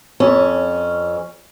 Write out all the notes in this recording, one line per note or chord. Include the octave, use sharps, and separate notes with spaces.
F2 C#4